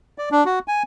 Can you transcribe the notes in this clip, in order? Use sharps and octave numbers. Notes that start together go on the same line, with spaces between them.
D5
D4
F#4
G#5